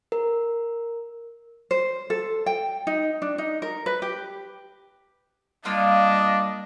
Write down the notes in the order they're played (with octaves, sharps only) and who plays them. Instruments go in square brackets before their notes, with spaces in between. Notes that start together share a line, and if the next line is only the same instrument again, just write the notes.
[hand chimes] A#4
[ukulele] C5
A4
G5
D#4
D4
D#4
A#4
B4
G4
[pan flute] G3 [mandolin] A#3 F4 F5 [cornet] D4 [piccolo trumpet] D#5